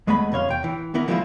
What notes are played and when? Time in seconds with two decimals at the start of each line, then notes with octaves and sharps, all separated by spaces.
0.07 D#2 G#3 A3 B3 D#5 B5
0.32 F2 C3 C#5 F5 C6
0.49 E2 G5
0.64 E3
0.94 D#3 E3 B3 E4 A#4
1.08 D3 F3 G3 G#3 E4 F4